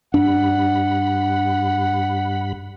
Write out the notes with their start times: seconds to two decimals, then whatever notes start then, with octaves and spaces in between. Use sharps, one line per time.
0.14 G2 D4 F#5 B5